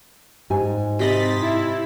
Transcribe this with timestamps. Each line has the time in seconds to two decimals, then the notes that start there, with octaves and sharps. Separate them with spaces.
0.50 G#2 G4 G#5
0.99 C3 D#5 B5 A6 B6
1.42 E4